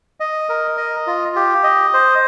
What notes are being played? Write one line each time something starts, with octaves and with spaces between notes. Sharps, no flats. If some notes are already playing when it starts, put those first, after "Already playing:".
D#5
A#4
D#5
F4
G4
D#5
C5